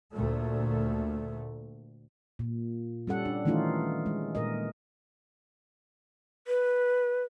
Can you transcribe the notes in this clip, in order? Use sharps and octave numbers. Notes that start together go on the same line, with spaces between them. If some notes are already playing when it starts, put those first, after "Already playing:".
D2 A#2 A3
A#2
G3 C#4 A4 F#5
D4
D#3 E3 A3 C#4 D#4 F4
G#3
A#2 A#4 D#5
B4